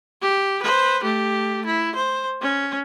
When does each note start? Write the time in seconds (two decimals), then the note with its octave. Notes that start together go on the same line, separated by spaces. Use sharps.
0.22 G4
0.62 B4 C5
1.03 A3 G4
1.66 E4
1.95 C5
2.42 C#4